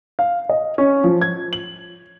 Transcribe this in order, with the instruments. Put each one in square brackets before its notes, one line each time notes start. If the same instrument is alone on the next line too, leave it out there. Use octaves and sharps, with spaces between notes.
[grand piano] F5
D#5
C#4
F3
G#6
F#7